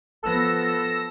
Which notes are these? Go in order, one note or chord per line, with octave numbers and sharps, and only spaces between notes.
F3 B3 A4 E6 A#6